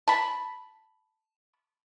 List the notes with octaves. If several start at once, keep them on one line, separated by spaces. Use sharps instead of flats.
A5 B5